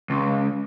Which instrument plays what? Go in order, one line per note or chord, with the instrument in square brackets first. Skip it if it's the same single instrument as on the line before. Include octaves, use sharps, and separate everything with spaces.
[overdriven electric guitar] C#2